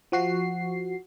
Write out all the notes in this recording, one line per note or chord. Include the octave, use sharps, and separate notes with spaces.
F3 F#4 C7